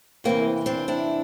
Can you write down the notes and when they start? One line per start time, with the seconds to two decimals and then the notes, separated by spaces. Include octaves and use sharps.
0.24 E2 C3 E3 A#3 C4
0.66 C4 D4
0.88 D4 E4